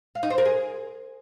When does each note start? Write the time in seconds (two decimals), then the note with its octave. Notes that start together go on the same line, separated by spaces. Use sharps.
0.15 F5
0.23 D#4
0.30 C5
0.38 A#4
0.45 G#4